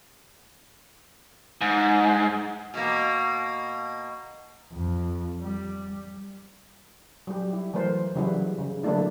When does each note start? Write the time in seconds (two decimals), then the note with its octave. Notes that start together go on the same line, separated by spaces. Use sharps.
1.61 G#2
2.74 B2 A#3
4.73 F2
5.41 G3
7.27 F#3 G3 G4
7.53 E4
7.74 E3 F#3 A3 A#4 C5
8.15 C#3 E3 F#3 G3 E4 F#4
8.59 C#3
8.83 D3 F#3 A3 A#3 D4 E4